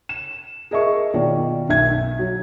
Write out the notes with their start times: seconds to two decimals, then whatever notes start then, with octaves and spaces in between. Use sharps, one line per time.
0.09 E7
0.71 G#4 A#4 D#5 E5 C#6
1.14 B2 D#3 F4 D5
1.69 B1 E5 G#6
2.19 F#3